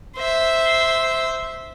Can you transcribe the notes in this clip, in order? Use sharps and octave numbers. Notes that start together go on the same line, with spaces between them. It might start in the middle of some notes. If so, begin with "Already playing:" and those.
C5 E5